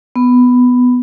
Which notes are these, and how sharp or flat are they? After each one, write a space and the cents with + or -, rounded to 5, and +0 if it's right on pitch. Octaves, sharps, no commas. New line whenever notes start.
B3 +5